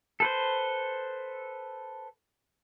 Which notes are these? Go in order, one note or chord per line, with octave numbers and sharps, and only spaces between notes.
A4 B4 C5